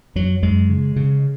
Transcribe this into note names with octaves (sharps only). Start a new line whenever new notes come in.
F#2 F#3
F#2 G#3
C#3
C#3